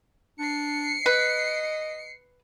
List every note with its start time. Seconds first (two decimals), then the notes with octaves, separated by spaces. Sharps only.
0.40 D4 C7 C#7
1.06 B4 D#5